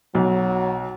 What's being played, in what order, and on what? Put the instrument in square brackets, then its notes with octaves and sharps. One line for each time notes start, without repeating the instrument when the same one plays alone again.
[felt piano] B1 [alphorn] F#3